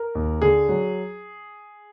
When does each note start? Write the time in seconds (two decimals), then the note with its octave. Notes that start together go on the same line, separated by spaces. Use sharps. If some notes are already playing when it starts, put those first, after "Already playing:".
Already playing: A#4
0.15 D#2
0.42 D3 G#4
0.69 F#3